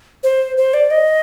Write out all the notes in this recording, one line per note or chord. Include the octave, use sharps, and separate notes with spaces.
C5
C5
D5
D#5